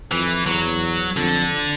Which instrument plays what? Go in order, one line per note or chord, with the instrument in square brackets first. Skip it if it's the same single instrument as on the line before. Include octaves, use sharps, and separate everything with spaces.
[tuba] F2 [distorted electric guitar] E3
[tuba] E2 [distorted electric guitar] F#3
[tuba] F2 [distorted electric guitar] D3